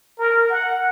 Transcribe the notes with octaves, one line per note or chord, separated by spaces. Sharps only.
A#4
F#5